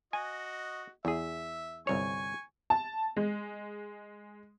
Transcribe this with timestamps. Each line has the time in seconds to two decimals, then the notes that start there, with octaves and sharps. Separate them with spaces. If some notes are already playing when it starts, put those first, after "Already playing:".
0.13 F#4 D#5 G#5
1.05 E2 G#4 E5
1.87 G1 C2 C#5 G#5 C#6
2.70 A5
3.17 G#3